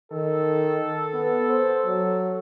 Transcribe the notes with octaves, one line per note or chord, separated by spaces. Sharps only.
D#3 A4
B3
C5
F#3